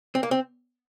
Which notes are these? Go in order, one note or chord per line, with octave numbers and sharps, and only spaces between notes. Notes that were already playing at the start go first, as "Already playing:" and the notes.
C4
A#3
C4